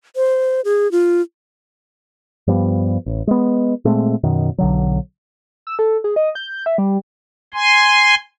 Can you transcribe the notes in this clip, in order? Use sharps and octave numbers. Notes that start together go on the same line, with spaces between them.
C5
G#4
F4
G2 F3 G3 B3
A1
G#3 B3
A#2 G#3 A3 C4
F#2 B2 D#3
B1 D3 F#3
E6
A4
G#4
D#5
G6
E5
G3
G#5 C6